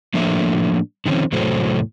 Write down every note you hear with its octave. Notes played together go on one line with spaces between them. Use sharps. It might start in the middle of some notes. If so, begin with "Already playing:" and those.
A2 F3 A#3 D4 A4 E5
D3 D#3 F3 C4 C#4
E2 A2 C3 F#3 A4 C5